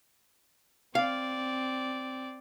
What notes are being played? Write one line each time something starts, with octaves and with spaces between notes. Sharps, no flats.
C4 D5 F5